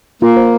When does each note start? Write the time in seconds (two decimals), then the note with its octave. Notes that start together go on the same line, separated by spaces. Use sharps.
0.22 A#3 F4
0.37 C5